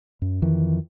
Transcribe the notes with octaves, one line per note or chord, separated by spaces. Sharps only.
F#2
F2 D#3 E3